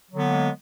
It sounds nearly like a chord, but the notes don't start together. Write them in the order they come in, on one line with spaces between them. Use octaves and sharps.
F#3 D3 B3 A#3 G#3